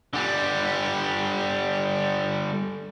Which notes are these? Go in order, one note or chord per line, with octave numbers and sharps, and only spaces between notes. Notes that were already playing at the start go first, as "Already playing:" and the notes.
D3 G3